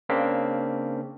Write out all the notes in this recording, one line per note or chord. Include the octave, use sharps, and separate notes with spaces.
C#3 A#3 C4 D4 F5 B6